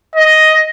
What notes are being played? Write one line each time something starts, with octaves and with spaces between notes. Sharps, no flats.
D#5